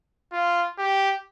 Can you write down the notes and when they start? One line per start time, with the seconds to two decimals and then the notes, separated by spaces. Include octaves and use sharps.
0.32 F4
0.78 G4